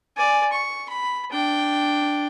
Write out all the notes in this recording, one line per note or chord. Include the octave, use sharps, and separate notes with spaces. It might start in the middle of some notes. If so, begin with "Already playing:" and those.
D5 G#5
C#6
B5
D4 G5